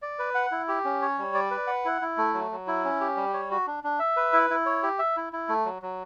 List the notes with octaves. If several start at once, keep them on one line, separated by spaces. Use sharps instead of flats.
D5
B4
F#5
E4
G4
C#4
C#5
G3
D5
B4
F#5
E4
E4
A3
F#3
F#3
E4
C#4
G4
G3
C#5
F#4
D4
D4
E5
B4
E4
E4
C#5
G4
E5
E4
E4
A3
F#3
F#3